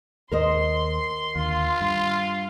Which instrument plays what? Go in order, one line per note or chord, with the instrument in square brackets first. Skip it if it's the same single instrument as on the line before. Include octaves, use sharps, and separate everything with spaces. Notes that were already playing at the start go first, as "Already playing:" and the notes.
[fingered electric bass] D#2 [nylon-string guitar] A#4 C5 D#5 [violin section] C6
[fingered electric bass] D#2 D3 [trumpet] F4
[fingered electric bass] G2